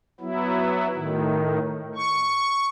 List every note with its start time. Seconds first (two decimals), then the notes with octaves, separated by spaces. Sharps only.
0.20 F#3 B3 E4
0.95 A2 D#3
1.96 C#6